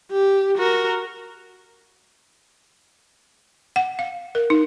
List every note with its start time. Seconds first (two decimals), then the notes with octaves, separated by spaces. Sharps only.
0.12 G4
0.58 F#4 A#4
3.76 F#5
3.99 F5
4.35 A#4
4.50 D#4